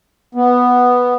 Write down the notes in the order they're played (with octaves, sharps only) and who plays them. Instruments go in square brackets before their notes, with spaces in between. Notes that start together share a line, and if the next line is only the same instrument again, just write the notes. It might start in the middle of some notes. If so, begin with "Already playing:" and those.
[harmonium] B3